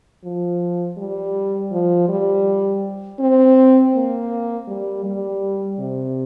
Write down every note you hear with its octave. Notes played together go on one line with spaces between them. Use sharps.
F3
G3
F3
G3
C4
A#3
G3
G3
C3